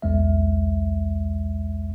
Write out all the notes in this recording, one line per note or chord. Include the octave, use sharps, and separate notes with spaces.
B1 E2 G#3 E5